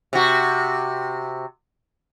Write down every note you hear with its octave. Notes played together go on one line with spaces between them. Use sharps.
C3 F#4